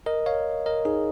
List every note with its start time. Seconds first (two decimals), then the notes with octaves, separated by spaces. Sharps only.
0.06 A#4 D#5
0.26 C#5 F5
0.66 A#4 D#5
0.85 D#4 G#4